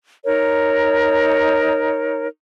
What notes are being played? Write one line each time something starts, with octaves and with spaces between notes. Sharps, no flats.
D#4 A#4 C#5